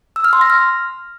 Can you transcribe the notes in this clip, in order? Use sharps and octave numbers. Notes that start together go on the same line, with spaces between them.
E6
F6
C6
A#6
F6